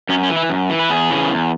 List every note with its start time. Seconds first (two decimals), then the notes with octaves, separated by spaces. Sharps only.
0.09 F#2 C#4
0.23 C#4
0.30 E3
0.36 E4
0.50 F#2
0.70 E3
0.79 B4
0.90 E2 G#4
1.10 C#3 E3
1.30 E2